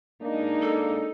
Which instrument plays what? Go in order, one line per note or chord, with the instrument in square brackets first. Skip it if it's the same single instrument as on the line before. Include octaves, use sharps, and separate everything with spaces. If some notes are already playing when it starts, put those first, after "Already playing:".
[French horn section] G#3 A#3 D4 [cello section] D#4
[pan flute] A4